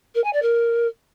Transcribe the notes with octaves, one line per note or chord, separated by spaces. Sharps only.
A#4
G#5
D5
A#4